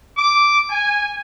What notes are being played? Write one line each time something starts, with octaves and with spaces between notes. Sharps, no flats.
D6
G#5